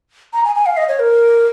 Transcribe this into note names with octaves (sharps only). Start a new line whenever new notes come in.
A#5
G#5
G#5
F5
D#5
C#5
A#4